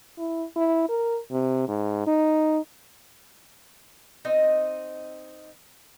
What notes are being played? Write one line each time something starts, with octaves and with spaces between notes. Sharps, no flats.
E4
E4
A#4
C3
G#2
D#4
C4 D#4 D#5